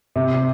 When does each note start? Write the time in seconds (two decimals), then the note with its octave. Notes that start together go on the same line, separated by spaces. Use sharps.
0.16 C3
0.35 C3